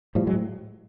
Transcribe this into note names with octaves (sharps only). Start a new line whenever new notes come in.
A2 F3 G3
F#3 G#3
A2